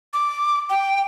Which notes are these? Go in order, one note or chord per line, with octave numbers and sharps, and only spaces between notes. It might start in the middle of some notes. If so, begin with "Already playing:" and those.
D6
G5